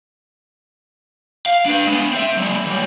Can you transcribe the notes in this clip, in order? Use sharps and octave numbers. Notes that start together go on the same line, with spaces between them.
F5
D4 B4
G#3 B3
C4 E5
F#3 G#3
E3 G3